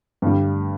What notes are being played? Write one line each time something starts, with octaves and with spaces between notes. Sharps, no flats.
G2 D3 G3